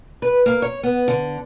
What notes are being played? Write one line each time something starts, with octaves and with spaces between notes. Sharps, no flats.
B4
A#3
C#5
B3
D3